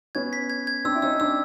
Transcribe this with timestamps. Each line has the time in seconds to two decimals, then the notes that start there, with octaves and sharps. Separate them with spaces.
0.15 B3 C#4 G#6
0.33 B6
0.50 G#6
0.67 G#6
0.85 C4 D4 E6
0.95 E4
1.02 C#4 D#4 E6
1.20 C4 D4 E6